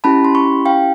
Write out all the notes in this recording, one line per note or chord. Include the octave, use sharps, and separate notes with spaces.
C#4 E4 G4 A5 B5
C6
B5 C#6
F5 G5